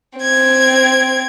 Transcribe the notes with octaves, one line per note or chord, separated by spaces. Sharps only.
C4 G#6